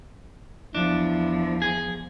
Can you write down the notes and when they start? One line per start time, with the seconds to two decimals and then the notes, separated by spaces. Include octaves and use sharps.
0.75 E2 F3 D4 E4
1.62 G#4